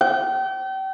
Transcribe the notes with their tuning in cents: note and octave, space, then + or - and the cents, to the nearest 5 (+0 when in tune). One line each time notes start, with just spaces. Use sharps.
G5 -35